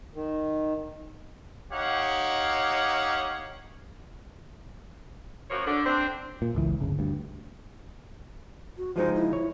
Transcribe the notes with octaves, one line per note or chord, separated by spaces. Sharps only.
D#3
D#4 G4 C#5 F5 F#5 D6
F#2 F3 A#3 F#4 C#5
D3 D4
C4 D4
A#2
G#1 C#2 E3
D1 G1 C#3
D2 G2
F#4
F3 G#3 D#4 C5
E4
C#5